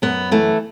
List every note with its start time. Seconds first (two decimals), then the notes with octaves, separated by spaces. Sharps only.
0.02 F#2 B3
0.31 E3 A3